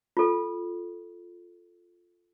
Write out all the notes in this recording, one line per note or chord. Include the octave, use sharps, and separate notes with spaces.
F4 A4